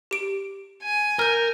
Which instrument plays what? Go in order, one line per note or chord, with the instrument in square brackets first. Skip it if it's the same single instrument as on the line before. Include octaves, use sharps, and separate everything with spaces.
[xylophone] G4 D7
[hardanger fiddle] G#5
[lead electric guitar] A#4 [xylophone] F6 G6